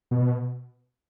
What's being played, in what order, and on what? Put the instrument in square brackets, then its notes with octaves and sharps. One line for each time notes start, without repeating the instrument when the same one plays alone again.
[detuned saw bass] B2